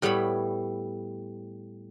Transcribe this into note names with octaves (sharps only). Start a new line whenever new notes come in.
A2 G3 B3 C#5 B5